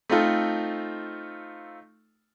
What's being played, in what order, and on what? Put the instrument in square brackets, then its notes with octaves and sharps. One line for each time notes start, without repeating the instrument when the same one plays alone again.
[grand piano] A3 C4 D#4 F4 A4